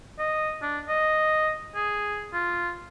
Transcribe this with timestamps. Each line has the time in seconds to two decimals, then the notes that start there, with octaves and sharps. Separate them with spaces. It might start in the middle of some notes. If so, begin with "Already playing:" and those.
0.19 D#5
0.62 D4
0.89 D#5
1.75 G#4
2.33 F4